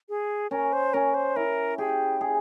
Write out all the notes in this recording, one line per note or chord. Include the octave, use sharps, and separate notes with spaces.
G#4
C#4 A#4
C5
C#4 A#4
C5
E4 A#4
G4 G#4
G#4